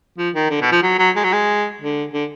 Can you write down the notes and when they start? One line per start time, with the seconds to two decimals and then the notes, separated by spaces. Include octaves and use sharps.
0.18 F3
0.35 D#3
0.50 D3
0.62 B2
0.72 F3
0.83 F#3
0.99 F#3
1.16 G#3
1.24 F#3
1.33 G#3
1.81 D3
2.13 D3